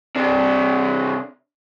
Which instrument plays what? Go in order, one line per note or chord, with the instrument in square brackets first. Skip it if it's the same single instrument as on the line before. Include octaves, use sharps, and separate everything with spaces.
[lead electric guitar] C3 D4